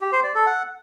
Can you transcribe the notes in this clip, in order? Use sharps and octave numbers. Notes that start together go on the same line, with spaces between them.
G4
C5
D5
A4
F#5